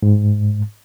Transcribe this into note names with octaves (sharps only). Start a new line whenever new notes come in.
G#2